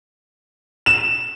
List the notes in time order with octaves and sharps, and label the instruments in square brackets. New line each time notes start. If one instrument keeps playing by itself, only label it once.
[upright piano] E7